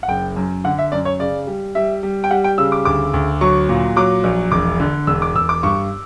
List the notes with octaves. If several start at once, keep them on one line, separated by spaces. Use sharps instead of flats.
F#5
F#1 G5
F#2
D3 F#5
E5
F#2 D5
C#5
C#3 D5
G3
G3 E5
G3
G5
G3 F#5
G5
C#3 E6
D6
D2 D6
D2
F#3 C#6
A#2
F#3 D6
A#1
E1 D6
D3
E1 E6
D6
E1 E6
D6
G2 C#6